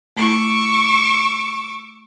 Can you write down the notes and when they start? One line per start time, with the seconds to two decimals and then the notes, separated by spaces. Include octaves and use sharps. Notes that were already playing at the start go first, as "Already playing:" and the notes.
0.17 A3 E4 C#6 D6 E6